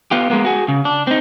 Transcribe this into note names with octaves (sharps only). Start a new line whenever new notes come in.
B3 F4 G4
G#3 A#3 B3
F#4 G#4
C#3
D4
C4 D#4